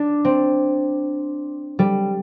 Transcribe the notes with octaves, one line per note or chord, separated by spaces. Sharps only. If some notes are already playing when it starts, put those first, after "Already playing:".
Already playing: D4
C4
G3